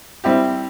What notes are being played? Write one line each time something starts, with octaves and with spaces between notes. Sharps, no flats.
G3 C4 E4 G4